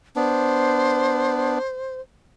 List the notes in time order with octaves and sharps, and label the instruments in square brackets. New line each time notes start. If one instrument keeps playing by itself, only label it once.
[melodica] B3 D4 [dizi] C5